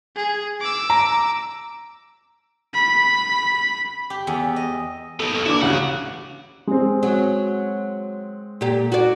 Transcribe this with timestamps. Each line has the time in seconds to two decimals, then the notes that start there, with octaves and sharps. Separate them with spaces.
0.16 G#4
0.61 D6 E6
0.90 A#5
2.74 B5
4.10 G4
4.27 E2
4.56 D#5
5.20 B3 D#4 A4
5.34 B1
5.46 E3 D4 E4 D6
5.62 A1 D2 C#3 E3 F#5
6.67 G#3 C4
7.03 F#3
8.61 A#2 G4
8.92 F#4 D5